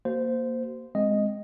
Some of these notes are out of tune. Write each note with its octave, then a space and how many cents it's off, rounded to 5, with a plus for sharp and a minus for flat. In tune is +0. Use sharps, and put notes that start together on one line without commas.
A#3 +0 F#4 +40 C5 -15
G#3 +0 C4 +0 D#5 +0